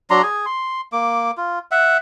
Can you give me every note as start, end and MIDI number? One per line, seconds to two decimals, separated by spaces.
0.10 0.22 54
0.10 0.22 62
0.10 0.22 82
0.10 0.22 84
0.23 0.46 68
0.23 0.46 80
0.46 0.81 84
0.92 1.31 58
0.92 1.31 86
1.37 1.59 65
1.71 1.98 76
1.71 1.98 78